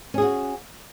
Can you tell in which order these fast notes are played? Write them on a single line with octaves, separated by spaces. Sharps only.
C#4 G#4 F#4